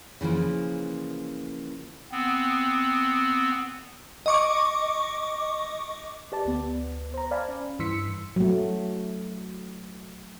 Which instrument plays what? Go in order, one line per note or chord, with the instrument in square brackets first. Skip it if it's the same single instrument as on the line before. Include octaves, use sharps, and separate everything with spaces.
[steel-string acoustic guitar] C#3 E3 F3 A#3
[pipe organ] B3 C4
[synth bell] D#5 C#6 D6
[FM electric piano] G4 B4 D5 A5
D2 B3
C5 A#5
C5 D5 F5 G#5 A5 B5
C#4
G2 E3 C6 E6 B6 C#7
[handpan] F#3 A3